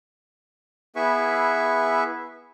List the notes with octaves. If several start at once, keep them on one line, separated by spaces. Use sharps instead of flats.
B3 E4 G#4 B4 E5 C#6